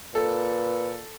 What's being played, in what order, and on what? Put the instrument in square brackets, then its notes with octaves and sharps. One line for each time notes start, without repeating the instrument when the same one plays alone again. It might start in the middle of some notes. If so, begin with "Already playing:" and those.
[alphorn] A#2 [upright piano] A4 [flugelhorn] B4